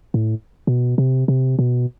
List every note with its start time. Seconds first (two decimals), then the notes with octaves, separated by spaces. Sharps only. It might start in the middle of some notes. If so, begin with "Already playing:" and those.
0.14 A2
0.67 B2
0.98 C3
1.28 C3
1.59 B2